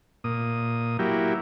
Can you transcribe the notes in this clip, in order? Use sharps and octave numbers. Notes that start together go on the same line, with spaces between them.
A#2 D#6
F#3 A#3 E4 G4